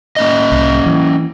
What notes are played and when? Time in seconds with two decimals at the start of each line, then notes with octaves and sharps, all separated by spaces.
0.16 A#3 C#4 D#5
0.52 C2
0.86 E3